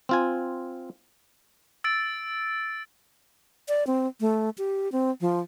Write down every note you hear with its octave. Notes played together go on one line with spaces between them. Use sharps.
C4 F4 G#5
E6 A6 D7
D5
C4
A3
G4
C4
F3